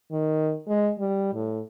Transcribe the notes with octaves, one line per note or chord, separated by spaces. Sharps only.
D#3
G#3
G3
A2